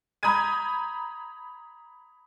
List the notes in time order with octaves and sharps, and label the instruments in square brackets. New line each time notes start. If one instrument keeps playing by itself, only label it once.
[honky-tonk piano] A#5 B5 D#6 G6 G#6 D#7